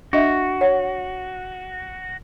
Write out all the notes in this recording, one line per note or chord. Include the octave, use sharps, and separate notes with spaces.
D4 F#4 D#5 E5
C#5 F#5